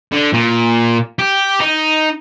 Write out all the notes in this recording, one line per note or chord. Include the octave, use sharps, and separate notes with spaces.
D3
A#2
G4
D#4